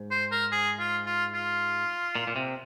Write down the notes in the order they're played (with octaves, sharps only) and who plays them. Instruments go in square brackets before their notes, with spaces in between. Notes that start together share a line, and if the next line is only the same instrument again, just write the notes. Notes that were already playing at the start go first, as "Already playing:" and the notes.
Already playing: [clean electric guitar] G#2
[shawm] C5
A#4
G#4
F4
F4
F4
[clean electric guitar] A#2
A#2
C3